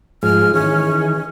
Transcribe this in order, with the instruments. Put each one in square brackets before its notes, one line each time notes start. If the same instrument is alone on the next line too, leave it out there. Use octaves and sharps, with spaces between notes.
[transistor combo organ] G#2 F3 G#4 [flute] F6
[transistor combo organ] D#3 E3 G#4 [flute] C#4